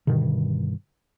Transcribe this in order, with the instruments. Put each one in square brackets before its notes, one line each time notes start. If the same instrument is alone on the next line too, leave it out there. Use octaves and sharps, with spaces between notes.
[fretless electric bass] G2 B2 D3 D#3